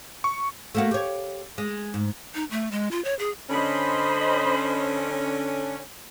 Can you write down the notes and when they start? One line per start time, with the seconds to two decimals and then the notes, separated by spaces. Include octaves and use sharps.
0.24 C#6
0.75 A3 A#3 F#4
0.91 G4 C#5
1.58 G#3
1.94 G#2
2.35 D#4
2.51 A3
2.71 G#3
2.91 F4
3.04 C#5
3.19 G#4
3.50 D3 C#4 C5 D#5 B5